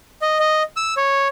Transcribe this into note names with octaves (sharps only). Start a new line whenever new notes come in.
D#5
D#5
E6
C#5